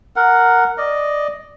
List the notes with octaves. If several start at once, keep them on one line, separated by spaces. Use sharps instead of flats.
A#4 F#5
D5 D#5